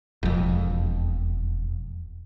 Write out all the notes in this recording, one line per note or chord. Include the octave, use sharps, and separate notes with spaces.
E1 F2